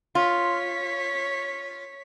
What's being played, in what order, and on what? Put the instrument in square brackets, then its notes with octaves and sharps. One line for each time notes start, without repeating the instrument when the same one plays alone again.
[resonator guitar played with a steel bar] F4 [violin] C#5 B6